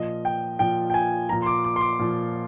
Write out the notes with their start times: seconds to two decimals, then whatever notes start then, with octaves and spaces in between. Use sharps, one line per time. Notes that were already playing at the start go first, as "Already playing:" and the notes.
Already playing: A#2 F3 D#5
0.25 G5
0.59 A#2 F3 G5
0.90 G5
0.94 G#5
1.29 A#2 F3 A#5
1.42 C6
1.46 D6
1.64 D6
1.76 C6
1.81 D6
1.99 A#2 F3